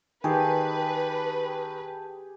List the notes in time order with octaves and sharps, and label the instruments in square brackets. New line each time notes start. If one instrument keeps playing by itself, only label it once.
[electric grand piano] D#3 [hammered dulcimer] G4 G#4 [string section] B4 [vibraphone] G5 A5